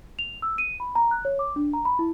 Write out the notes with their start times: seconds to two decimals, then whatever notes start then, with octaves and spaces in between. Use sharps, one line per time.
0.19 F7
0.42 E6
0.58 D#7
0.80 B5
0.95 A#5
1.11 F#6
1.25 C#5
1.39 D6
1.56 D4
1.73 A#5
1.85 B5
1.99 E4